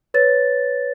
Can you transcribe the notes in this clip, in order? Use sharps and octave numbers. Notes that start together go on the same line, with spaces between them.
B4 C#5 A6